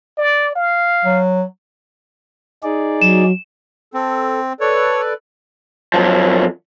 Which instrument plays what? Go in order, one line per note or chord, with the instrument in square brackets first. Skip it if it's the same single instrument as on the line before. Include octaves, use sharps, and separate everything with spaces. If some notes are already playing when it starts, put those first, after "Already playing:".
[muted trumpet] D5
F5
[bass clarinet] F#3
[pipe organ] D#4 G#4 D5
[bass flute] F#3 [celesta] E7
[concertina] C4 [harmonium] A4
[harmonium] A4 B4 D5 [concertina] C#5
[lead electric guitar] F#2 F3